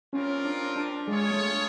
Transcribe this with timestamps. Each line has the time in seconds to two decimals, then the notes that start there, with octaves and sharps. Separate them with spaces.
0.13 G3 C4 C#4 F4 A#4
0.45 D4
0.76 D4
1.07 G#3 F4 G#4 C#5
1.31 A3